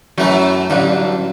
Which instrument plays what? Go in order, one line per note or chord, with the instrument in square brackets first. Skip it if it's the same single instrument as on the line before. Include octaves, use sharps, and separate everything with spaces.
[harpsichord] F#2 E3 A3 [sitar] F#3
[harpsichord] A1 G2 D3 [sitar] F#3